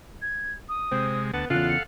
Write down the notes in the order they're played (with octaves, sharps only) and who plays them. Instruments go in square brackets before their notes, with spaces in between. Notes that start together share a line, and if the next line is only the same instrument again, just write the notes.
[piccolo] G#6
D#6
[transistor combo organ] C3 G#3 [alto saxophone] C4
[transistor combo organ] D2 F#5 A5 [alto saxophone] B3
[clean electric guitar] E2 C#3 [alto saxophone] F4 [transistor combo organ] A4 F5 F#5 [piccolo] F#6
[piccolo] C#7